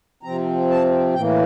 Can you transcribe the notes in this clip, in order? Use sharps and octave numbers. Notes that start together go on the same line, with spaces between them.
C3 F3 C4 A#5
A5
A2 E3 A#3 G5